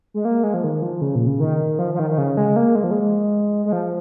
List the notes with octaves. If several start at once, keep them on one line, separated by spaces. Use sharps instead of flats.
G#3
A#3
G#3
F3
D#3
F3
C#3
A#2
C#3
D#3
F3
F3
D#3
D#3
C#3
G#3
A#3
G#3
F3
G#3
G#3
F3